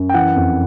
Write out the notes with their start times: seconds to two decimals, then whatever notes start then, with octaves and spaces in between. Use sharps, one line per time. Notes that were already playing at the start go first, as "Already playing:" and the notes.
Already playing: F#2
0.09 G5
0.14 E3 F#5
0.36 F2